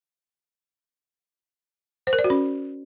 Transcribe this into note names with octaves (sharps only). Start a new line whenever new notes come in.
C5
A#4
D5
F#4
C#4